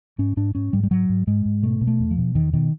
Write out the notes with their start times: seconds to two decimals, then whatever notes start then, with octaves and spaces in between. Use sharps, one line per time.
0.18 G#2 C#4
0.37 G#2 D4
0.55 G#2 C#4
0.73 G#2 G3
0.83 G3
0.91 G#2 F#3
1.09 G#2
1.27 G#2 G#3
1.45 G#2
1.63 B2 A3
1.81 B2
1.87 A3
2.00 E2
2.11 F3
2.17 B2
2.35 E2 D#3
2.53 B2 D#3